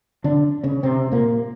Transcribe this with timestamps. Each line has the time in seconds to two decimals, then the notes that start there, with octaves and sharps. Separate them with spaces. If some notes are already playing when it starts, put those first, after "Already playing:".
0.24 D3 D4
0.63 C#3 C#4
0.83 C3 C4
1.12 A#2 A#3